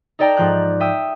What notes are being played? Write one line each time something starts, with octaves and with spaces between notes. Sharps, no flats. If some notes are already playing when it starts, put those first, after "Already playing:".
D#4 A4 D5 G5 A#5
G#2 F3 F#6 G6
E5 G5 D#6